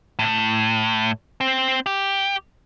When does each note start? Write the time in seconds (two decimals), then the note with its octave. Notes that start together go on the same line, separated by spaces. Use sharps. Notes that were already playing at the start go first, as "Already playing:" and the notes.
0.19 A2
1.41 C4
1.86 G4